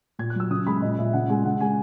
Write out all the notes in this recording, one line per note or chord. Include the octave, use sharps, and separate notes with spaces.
A#2 G#6
F#6
F#3 E6
C#3 D#6
G#3 B5
A#2 D#5
A#2 E5
C#3 F#5
G#3 G#5
C#3 F#5
G#3 G#5